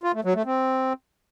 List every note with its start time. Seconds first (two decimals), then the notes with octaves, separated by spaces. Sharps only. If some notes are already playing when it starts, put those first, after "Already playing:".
0.03 F4
0.14 A3
0.24 F#3
0.35 A3
0.45 C4